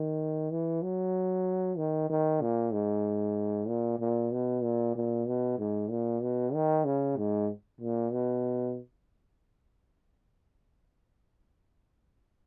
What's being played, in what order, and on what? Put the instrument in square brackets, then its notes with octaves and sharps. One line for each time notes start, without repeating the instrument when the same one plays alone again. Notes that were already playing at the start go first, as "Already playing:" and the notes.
Already playing: [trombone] D#3
E3
F#3
D#3
D#3
A#2
G#2
A#2
A#2
B2
A#2
A#2
B2
G#2
A#2
B2
D#3
C#3
G#2
A#2
B2